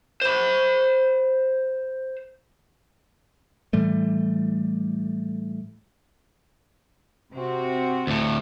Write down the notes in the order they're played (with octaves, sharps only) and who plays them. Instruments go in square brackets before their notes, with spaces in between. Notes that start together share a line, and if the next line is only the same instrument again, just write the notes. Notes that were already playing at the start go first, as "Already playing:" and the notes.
[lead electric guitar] C5 B5
[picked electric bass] A2 E3 G3 A3
[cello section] C3 C4 F#4
[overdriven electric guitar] D2 A2